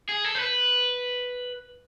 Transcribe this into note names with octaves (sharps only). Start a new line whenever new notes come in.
G#4
A4
C5
B4